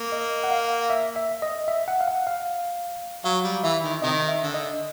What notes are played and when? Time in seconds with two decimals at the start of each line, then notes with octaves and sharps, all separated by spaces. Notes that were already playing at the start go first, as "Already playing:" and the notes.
Already playing: A#3
0.12 D#5
0.44 F#5
0.51 F5
0.90 E5
1.16 E5
1.42 D#5
1.68 E5
1.88 F#5
2.01 F5
2.08 F#5
2.27 F5
3.24 F#3 F5
3.44 G3
3.63 E3 E5
3.83 D#3
4.02 C3 D#3 D#5
4.28 E5
4.42 D3
4.54 D#5